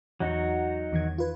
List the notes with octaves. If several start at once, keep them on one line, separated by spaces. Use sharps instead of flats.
E2 F#3 D#4 F#4
E2 D#3 G#6
F4 B4